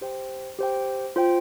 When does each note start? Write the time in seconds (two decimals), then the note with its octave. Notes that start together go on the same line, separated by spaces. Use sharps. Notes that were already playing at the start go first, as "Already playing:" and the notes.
0.01 G4 C5 G5
0.59 G4 C5 G5
1.16 F4 C5 G5